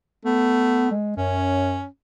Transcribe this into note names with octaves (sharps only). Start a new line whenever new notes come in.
A3 B3
G#3
F#2 C#4